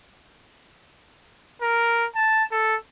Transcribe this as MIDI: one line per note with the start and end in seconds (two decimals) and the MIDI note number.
1.62 2.06 70
2.16 2.44 81
2.52 2.76 69